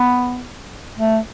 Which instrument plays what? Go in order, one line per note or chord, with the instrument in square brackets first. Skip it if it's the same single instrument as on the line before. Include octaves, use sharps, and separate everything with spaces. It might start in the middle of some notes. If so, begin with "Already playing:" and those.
Already playing: [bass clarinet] B3
A3